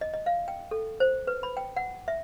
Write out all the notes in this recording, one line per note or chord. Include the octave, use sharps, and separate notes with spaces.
D#5
D#5
F5
G5
A4
C5
B4
B5
G5
F#5
E5